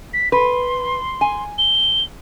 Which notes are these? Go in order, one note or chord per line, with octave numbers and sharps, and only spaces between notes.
B6
B4 C6
G#5
G7